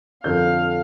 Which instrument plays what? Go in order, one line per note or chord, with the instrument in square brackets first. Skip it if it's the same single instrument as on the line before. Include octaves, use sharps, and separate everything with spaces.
[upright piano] F2 D3 G6 [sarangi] F5